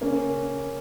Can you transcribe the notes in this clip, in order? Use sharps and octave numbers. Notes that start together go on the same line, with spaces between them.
C#3 A#3 C#4